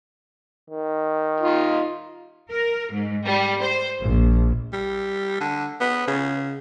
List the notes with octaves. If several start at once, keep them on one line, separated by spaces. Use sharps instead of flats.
D#3
D#4 F4
A#4
G#2
G3
C5
A#1
G3
D3
B3
C#3